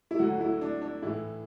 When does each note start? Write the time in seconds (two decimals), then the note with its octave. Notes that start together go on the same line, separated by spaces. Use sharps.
0.11 E4
0.19 D2 D3 F#3 F#4
0.40 E4
0.61 D4
0.82 D4
1.02 A2 E3 E4